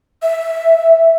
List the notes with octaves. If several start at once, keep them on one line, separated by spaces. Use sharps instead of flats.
E5